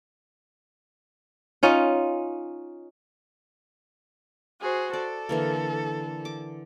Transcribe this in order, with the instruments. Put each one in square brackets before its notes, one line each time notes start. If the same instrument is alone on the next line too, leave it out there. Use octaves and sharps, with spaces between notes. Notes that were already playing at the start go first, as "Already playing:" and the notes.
[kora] C#4 D#4 F4
[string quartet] F#4 G#4 C5
[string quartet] A4 [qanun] D5
[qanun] D3 E3 A#3
D6